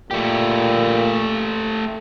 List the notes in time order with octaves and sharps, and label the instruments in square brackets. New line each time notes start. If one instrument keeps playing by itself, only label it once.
[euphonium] A#2 [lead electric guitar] A3 G4